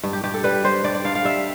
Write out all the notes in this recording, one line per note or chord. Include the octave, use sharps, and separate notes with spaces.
G2
G4
G2 G4
A4
G3 B4
G3 C5
G2 D5
D5
G2 F5
F5
G3 E5